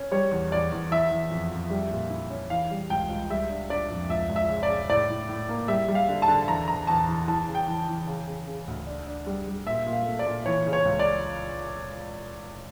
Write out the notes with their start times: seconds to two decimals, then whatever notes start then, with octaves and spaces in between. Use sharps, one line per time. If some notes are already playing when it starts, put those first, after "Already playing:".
Already playing: C#4
0.11 G3 C#5
0.31 E2
0.52 E2 D5
0.72 E2
0.91 E3 E5
1.11 E3
1.31 F2
1.51 F2
1.70 G3
1.91 A#2
2.10 E4
2.30 C#4
2.50 E3 F5
2.71 G3
2.90 C#2 G5
3.09 C#2
3.30 G3 E5
3.49 D4
3.69 D4 D5
3.90 F2
4.09 C#2 E5
4.29 C#2
4.36 E5
4.49 C#3
4.63 D5
4.69 C#3
4.90 A2 D5
5.09 A2
5.29 A2
5.49 A#3
5.68 G3 E5
5.88 G3
5.95 F5
6.09 D3
6.22 A5
6.28 D3
6.48 E2 A#5
6.68 E2 A#5
6.87 E2 A5
7.08 E3
7.28 E3 A5
7.47 C#3
7.55 G5
7.68 E3
7.88 E3
8.07 C#3
8.27 C#3
8.47 C#3
8.67 D2
8.87 D4
9.07 D4
9.26 G3
9.47 G3
9.67 A#2 E5
9.86 A#2
9.93 F5
10.06 A3
10.19 D5
10.26 A#2
10.46 E3 C#5
10.66 C#3
10.73 C#5
10.85 C#2
10.99 D5